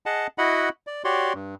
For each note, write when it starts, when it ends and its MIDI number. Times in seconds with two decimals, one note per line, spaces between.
0.06 0.27 68
0.06 0.27 75
0.06 0.27 78
0.06 0.27 81
0.38 0.69 64
0.38 0.69 66
0.38 0.69 75
0.38 0.69 78
0.38 0.69 83
0.87 1.03 74
1.04 1.33 66
1.04 1.33 67
1.04 1.33 73
1.04 1.33 74
1.04 1.33 84
1.34 1.55 43